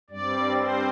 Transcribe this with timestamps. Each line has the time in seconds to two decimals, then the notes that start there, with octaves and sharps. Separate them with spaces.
0.10 G2 G3 C4 D5
0.58 C5